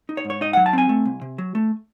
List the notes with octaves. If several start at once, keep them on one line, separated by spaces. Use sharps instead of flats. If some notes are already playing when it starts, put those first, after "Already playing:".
D#4
C#5
G#2
C#5
D#4 D#5
F#3 F#5
A5
C4 G#5
A3
C2
C3
F#3
A3